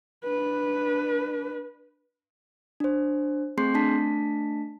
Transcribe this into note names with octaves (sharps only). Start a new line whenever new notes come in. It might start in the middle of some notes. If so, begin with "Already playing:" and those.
D4 B4
D4 C5
A3 C4 G#4 C6 G6 C7
A3 D4 A5 B6